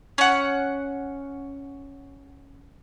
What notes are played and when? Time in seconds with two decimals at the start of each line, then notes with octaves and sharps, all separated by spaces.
0.18 C#4 F#5